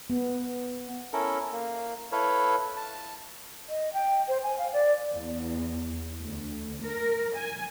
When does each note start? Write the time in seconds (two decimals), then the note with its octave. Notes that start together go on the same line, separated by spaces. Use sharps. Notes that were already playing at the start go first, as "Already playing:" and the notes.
0.10 B3
1.13 C#4 E4 A4 A#4
1.53 A#3
2.12 E4 A4 B4 C#5 F5
2.77 A5
3.69 D#5
3.93 G5
4.28 C5
4.43 G#5
4.59 F5
4.73 D5
5.16 E2
6.21 D2
6.83 A#4
7.36 G#5